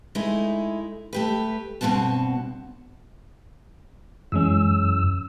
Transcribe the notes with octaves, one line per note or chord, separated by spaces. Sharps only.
G#3 A3 D#4 E4
A3 G4 B4
G2 B2 D#3 C4 F#4 A5
F#2 E3 G#3 C#4 E6